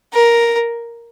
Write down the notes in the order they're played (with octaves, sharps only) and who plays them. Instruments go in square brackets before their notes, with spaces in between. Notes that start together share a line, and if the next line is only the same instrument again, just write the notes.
[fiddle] A#4